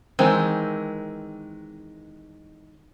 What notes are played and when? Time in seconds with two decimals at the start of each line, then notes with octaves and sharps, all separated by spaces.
0.19 D#3 E3 G#3 C4